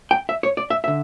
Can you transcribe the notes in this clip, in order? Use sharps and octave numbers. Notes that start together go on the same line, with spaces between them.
G5
E5
C#5
D5
E5
D3 E5